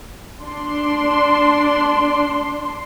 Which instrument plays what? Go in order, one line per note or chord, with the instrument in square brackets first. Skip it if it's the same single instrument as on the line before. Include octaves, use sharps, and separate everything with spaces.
[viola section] D4 C6